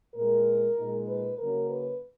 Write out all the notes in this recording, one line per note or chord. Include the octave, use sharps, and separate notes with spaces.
A#2 G#3 B3 A#4
A#2 G#3 D#4
B4
C#3 F#3 A#3 C#4 A#4
B4